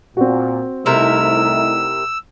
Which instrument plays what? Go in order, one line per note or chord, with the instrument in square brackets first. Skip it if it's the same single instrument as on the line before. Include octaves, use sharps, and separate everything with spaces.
[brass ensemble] A#2 [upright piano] C4 F#4
[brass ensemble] C2 A3 D#4 [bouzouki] C3 E4 A#4 [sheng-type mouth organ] E6